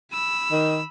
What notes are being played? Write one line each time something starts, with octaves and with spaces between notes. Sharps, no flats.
B5 E6
D#3